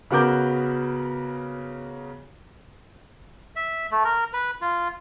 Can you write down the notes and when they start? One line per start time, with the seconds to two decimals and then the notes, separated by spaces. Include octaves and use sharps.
0.11 C#3 B3 F#4 A#4 D6 G6
3.56 E5
3.91 A3
4.04 A#4
4.33 B4
4.61 F4